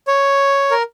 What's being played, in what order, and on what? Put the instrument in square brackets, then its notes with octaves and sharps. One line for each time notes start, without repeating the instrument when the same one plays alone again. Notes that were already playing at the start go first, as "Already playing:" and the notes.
[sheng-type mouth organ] C#5
A#4